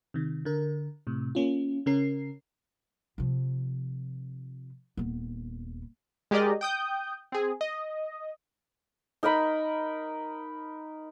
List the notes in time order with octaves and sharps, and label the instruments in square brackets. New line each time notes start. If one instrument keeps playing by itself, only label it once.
[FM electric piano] C3 D#3
D3 A#4
A2 C3
A#3 C#4 F4
C#3 C#4 A#4 C7
[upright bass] C3 F3
D#1 B3
[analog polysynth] G#3 G4 G#4 A#4 D5 D#5
G5 D#6 G6
C4 G#4
D#5
[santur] D#4 A#4 D#5 B5